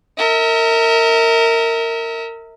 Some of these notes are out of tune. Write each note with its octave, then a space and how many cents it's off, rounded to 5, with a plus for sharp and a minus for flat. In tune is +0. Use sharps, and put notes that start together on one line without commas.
A#4 -25 E5 -40